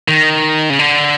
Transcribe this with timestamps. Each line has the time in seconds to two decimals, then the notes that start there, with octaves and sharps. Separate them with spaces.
0.08 D#3
0.70 C#3
0.79 D3